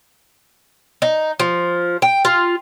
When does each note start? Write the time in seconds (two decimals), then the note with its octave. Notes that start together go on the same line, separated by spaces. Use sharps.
1.02 D#4
1.40 F3
2.02 G5
2.25 F4